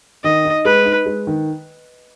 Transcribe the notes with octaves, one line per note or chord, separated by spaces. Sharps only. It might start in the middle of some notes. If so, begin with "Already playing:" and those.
D#3 D#5
D#4
G#3 B4
D#4
G#3
D#3